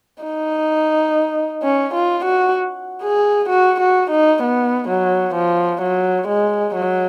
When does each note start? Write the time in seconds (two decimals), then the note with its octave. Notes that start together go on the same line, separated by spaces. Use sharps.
0.23 D#4
1.63 C#4
1.94 F4
2.25 F#4
3.02 G#4
3.49 F#4
3.80 F#4
4.11 D#4
4.43 B3
4.89 F#3
5.35 F3
5.82 F#3
6.28 G#3
6.75 F#3